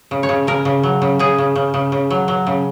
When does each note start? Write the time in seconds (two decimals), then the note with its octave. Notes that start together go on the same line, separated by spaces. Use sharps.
0.11 C#3
0.23 C#5
0.29 C#3
0.47 C#3 A#4
0.65 C#3
0.83 F#3
1.02 C#3
1.19 C#3 G#4
1.38 C#3
1.56 C#3
1.74 C#3
1.92 C#3
2.10 F#3
2.28 F#3
2.47 C#3